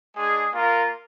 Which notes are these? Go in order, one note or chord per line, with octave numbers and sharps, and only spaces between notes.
G#3 D4 G#4
A#3 F4 A#4